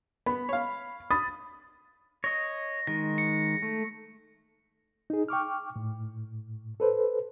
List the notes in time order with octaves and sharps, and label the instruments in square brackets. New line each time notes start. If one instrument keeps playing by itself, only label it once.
[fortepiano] B3 [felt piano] B5
[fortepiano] C#5 F5
[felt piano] B5 D#6 A6
[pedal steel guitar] C#5 D#5 [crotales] A#6
[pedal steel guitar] D#3 G#3 [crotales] A#6
[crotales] C#7
[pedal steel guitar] A3
[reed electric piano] D#4 G#4
G5 C#6 D6 F6
A2
A4 B4 C5